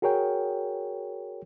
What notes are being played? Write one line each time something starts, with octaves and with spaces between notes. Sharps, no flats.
F#4 G#4 A#4 C#5 G5